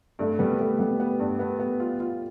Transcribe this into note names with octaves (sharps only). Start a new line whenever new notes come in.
G2 A3
G3 B3
A3 B3
G3 B3
B3
G2
B3
B3
F4
F4